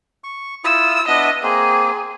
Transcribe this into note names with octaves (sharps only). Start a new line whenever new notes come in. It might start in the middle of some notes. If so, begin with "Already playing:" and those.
C#6
E4 F4 D#6 E6
B3 D4 D#5 E5
A#3 C4 G#4